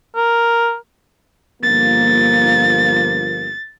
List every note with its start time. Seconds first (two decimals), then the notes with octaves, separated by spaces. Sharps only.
0.15 A#4
1.63 G1 F3 A#3 A6